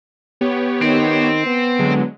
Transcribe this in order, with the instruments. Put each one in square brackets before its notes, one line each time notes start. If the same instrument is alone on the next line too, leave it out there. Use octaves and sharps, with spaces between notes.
[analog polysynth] B3 G4 C#5
[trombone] D#3 [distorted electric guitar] C4
[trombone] B3
[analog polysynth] D3 F#3 G#3